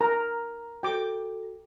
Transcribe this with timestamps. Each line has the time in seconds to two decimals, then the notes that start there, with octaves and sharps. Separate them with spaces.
0.01 A#4 A#5
0.83 F#4 A4 G5 D6